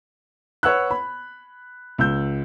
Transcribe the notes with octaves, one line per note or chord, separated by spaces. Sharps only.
B4 C#5 F#5 E6 F#6
B5
C#2 E6 G6